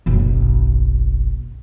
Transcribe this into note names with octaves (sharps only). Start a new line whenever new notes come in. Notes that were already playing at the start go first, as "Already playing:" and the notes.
F#1 B1